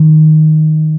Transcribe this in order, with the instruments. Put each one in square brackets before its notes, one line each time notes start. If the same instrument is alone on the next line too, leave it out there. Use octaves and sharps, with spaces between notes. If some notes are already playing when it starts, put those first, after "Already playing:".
Already playing: [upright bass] D#3